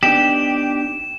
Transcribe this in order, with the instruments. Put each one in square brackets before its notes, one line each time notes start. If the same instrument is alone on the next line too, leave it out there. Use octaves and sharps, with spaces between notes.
[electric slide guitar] B3 D4 D#4 [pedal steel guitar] G4 [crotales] E7